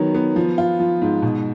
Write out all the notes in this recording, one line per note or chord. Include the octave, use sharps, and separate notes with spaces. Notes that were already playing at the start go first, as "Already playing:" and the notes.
Already playing: D#3 F#3 B3
B3
F3
F4
F3
G#2
B2